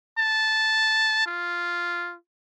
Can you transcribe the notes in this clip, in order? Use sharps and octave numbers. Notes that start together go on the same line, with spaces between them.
A5
F4